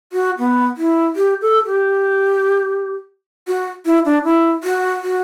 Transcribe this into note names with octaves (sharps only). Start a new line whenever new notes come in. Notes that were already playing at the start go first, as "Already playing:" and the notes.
F#4
B3
E4
G4
A4
G4
F#4
E4
D4
E4
F#4
F#4